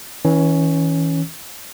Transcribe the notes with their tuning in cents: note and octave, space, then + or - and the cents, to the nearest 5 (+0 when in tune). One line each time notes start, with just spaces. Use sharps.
E3 -30 C#4 +0